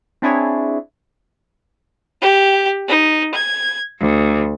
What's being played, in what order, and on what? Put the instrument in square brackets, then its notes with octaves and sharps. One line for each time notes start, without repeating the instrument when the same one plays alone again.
[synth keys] C4 D4 E4 G#4 C#5
[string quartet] G4
D#4
G#6
D2